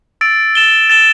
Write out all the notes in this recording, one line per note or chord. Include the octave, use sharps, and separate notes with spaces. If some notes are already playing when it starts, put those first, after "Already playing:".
E6 A6 D7
A6 E7 G7
A6 E7 G7